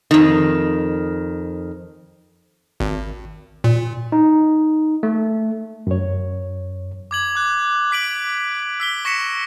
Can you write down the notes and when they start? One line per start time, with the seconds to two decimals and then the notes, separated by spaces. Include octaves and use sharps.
0.11 F2 D#3
2.80 G#1
3.64 A#2
4.12 D#4
5.03 A3
5.87 F#2 C#5
7.11 D6 G#6 F#7
7.35 D6 F#6
7.91 D6 B6 D7 F#7
8.80 E6 B6 G7
9.05 C#6 A#6 B6 C#7 E7